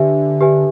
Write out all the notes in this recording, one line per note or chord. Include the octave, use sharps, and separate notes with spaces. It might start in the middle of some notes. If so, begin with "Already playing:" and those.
Already playing: D3 G4 B4 E5 G#5
G4 B4 E5 G#5